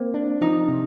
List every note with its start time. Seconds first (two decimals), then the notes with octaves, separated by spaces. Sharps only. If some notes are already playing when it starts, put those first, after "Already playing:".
Already playing: A#3 C4
0.14 D4
0.41 F3 D#4
0.68 C3